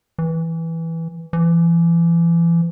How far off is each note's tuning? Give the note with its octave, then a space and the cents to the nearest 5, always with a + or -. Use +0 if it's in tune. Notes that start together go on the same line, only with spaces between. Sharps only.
E3 -5
E3 +35